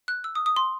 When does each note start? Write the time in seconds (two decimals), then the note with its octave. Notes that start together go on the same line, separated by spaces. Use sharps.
0.08 F#6
0.24 E6
0.35 D#6
0.46 D#6
0.56 C6